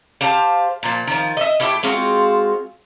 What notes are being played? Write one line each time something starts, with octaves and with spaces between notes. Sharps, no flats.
G4 C5 F5 A5
A#2 F3
D#3 F3
D#5 E5
A3 E4 G4 G5
G#3 C4 F4 F#4